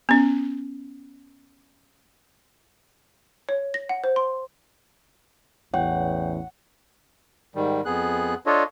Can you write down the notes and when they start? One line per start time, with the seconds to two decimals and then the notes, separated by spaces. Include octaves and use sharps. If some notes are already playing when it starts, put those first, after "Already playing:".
0.09 B3 C#4
3.49 C#5
3.74 A#6
3.89 F#5
4.04 C5
4.16 C6
5.74 A1 E2 C#5 F#5 G5
7.55 G#2 D#3 G3
7.85 F2 B3 G#4 F#6
8.46 D4 F4 A4 C#5 D#5